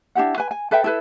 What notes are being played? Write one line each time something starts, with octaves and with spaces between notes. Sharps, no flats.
D4 E4 G4 F#5
B4 G#5
G#5
A4 B4 E5 G5
E4 A4 B4